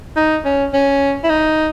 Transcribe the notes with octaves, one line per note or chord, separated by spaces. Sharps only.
D#4
C#4
C#4
E4
D#4